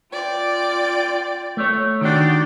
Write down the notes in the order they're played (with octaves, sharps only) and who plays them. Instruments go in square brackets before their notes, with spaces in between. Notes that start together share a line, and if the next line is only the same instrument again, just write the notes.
[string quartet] F4 D5 G5
[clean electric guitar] A3 C#5
[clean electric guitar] D#3 D4 [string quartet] F#4 G4 D5